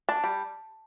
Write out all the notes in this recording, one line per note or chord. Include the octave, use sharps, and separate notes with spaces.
D4 A5
G3